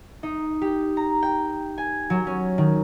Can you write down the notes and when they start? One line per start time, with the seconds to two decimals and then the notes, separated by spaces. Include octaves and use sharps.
0.23 D#4
0.61 G4
0.97 A#5
1.23 G5
1.78 G#5
2.10 F#3
2.27 C#4
2.58 D#3